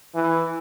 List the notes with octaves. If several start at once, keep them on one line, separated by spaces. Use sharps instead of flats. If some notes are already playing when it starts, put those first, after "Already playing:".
E3